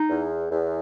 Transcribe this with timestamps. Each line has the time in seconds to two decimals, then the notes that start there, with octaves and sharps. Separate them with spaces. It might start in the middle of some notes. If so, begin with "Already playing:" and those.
Already playing: D#4
0.10 E2
0.50 E2